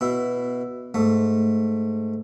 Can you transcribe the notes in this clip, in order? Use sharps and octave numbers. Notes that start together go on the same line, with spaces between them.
B2 E4
G#2 A3